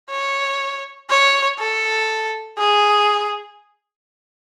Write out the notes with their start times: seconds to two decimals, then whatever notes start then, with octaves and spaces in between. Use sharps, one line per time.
0.10 C#5
1.10 C#5
1.59 A4
2.58 G#4